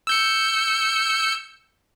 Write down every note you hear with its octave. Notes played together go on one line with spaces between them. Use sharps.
E6 G6 C#7